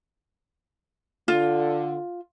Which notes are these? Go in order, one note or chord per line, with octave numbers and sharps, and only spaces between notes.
D3 F4